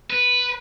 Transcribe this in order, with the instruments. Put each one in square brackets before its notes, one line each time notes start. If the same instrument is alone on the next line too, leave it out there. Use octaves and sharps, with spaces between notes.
[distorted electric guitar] B4